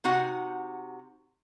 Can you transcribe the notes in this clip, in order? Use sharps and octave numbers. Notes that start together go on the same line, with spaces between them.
C3 D#4 F#4 F#5